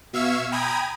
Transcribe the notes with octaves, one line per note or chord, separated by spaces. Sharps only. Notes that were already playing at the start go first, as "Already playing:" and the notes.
B2 E5 F5 C#6 E6 G#6
G5 G#5 A#5 B5 D#6 G#6